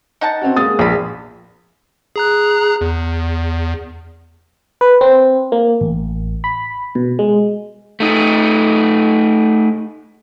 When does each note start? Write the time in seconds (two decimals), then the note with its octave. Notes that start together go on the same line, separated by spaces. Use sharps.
0.21 D#4 F#5 A5
0.41 C4 C#4 F#4
0.56 G#3 A#3 D#6 A6
0.79 A#1 G#4 B5
2.16 G#4 A#5 F#6
2.81 E2
4.81 B4
5.01 C4
5.52 A#3
5.81 A1
6.44 B5
6.95 B2
7.19 G#3
8.00 A3 D#4